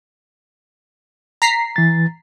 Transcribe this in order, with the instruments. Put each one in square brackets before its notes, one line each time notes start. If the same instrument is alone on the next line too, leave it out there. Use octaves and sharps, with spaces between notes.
[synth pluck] A#5 B6 C7
[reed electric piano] E3 A6